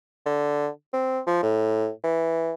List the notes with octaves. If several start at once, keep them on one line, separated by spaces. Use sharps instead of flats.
D3
C4
F3
A2
E3